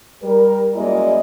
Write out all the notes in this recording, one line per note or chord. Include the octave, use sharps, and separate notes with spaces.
G3 A#4
F#2 G#3 A#3 E4 D5 D#5